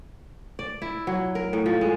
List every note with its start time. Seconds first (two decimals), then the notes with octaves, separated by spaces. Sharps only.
0.59 D5
0.82 E4
1.07 F#3
1.35 A#4
1.53 A2
1.66 F3
1.81 G#3